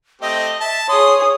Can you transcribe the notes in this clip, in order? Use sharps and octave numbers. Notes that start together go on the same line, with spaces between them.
A3 C4 G4 D#5
E5 A5
G#4 C#5 C6 D#6